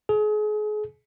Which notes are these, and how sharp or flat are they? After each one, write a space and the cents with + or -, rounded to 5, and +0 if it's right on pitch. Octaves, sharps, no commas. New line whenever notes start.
G#4 +35